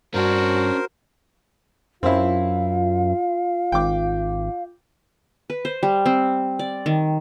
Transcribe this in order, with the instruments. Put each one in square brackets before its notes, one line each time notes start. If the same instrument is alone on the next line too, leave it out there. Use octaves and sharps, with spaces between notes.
[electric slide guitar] G2 [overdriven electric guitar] C#4 D4 [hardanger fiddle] F#4 [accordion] A#4 C5
[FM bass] F#2 [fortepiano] C4 E4 [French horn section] F4 [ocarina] F5
[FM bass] G#1 [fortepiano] G5 D6
[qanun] B4
C5
G3
C4
D5
D#3